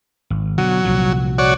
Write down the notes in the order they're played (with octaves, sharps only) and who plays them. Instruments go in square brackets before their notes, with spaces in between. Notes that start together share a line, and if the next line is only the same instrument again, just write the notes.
[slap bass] G#1
[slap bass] B2 D3 [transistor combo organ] F#3
[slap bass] C2 A#2 F3
[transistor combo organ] F#4 C#5 D5